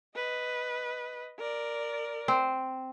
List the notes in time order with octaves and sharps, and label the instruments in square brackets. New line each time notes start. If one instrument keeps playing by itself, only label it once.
[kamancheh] B4 D#5
A#4 D5
[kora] C4